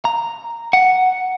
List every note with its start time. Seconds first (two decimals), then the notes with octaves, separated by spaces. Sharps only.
0.05 A#5
0.73 F#5